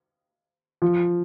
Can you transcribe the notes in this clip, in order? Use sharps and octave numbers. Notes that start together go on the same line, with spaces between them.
F3